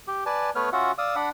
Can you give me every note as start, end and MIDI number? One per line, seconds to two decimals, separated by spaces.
0.08 0.24 67
0.26 0.50 71
0.26 0.50 74
0.26 0.50 80
0.26 0.50 81
0.55 0.70 57
0.55 0.70 59
0.55 0.70 71
0.55 0.70 73
0.55 0.70 89
0.73 0.92 61
0.73 0.92 65
0.73 0.92 66
0.73 0.92 76
0.73 0.92 78
0.98 1.16 74
0.98 1.16 77
0.98 1.16 87
0.98 1.16 88
1.16 1.29 62
1.16 1.29 74
1.16 1.29 78
1.16 1.29 83